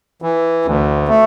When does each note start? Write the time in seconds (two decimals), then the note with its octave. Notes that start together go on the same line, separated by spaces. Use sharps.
0.22 E3
0.65 D2
1.08 A3